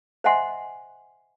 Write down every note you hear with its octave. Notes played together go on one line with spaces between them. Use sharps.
C5 D#5 E5 F#5 G#5 C6